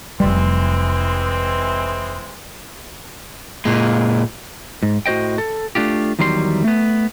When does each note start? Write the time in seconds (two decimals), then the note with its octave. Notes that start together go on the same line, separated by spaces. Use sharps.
0.20 F1 E3 G3 G#3 C4
3.65 A#2 G#3
4.83 G#2
5.06 A2 F#4 C5 D#5 G5
5.38 A4
5.75 A3 D4 F4 G4
6.19 E2 D#3 F#3 G3 A#4 C6
6.64 A3 B3